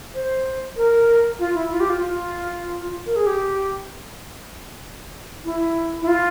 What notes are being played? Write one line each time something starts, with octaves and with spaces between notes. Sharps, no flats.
C5
A#4
F4
E4
F4
G4
F4
F4
A#4
G#4
G4
E4
E4
F4